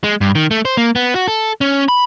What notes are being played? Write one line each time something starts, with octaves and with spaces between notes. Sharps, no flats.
G#3
G2
D#3
A3
C5
A#3
B3
F#4
A4
C#4
B5